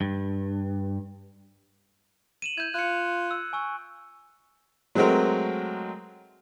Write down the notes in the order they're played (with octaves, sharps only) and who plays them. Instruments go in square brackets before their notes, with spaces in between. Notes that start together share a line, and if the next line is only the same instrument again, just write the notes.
[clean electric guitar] G2
[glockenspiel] D#7 E7 F#7
[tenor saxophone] E4 [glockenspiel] G6 G#6
[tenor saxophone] F4 [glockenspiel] F#6 G#6 C#7
[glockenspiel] E6
G#5 C#6 E6
[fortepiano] F#3 G#3 A3 C4 F#4 A#4